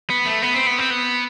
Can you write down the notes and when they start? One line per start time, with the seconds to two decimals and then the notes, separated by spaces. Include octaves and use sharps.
0.10 B3
0.26 A3
0.42 B3
0.54 C4
0.67 B3
0.78 C4
0.90 B3